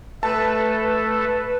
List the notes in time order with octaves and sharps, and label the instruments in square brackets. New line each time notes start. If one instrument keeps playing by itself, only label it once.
[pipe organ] A3 A4 [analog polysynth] B4 [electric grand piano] A5